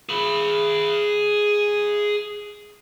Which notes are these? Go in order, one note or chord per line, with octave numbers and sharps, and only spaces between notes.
G#4 B5